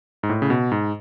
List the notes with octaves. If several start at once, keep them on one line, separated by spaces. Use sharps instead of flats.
G#2
A2
C#3
B2
G#2